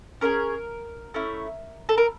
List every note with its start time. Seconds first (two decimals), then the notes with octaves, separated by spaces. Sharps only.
0.21 C#4 E4 G#4 A#4
1.14 A3 C#4 E4
1.89 A4
1.98 A#4